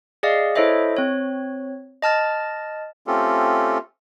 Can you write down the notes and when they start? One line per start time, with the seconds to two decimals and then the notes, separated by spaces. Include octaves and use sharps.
0.23 G#4 D5 D#5 F5
0.55 E4 A4 C5 C#5 D#5 E5
0.97 C4 C#5
2.02 D#5 A5 F6 A6
3.07 A3 C4 C#4 F4 G4 A4